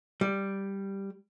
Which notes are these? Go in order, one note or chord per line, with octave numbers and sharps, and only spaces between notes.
G3